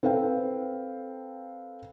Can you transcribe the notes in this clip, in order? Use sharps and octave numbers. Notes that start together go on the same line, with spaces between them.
C4 A4 B4 F5 G5